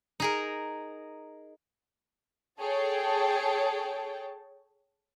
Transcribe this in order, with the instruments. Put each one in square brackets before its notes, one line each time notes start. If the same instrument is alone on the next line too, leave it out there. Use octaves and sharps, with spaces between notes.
[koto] D#4 G#4 A#4
[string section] G#4 A4 C#5 G5 A5